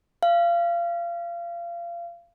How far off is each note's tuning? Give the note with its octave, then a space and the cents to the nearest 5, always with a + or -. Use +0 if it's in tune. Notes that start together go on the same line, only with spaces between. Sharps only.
F5 -25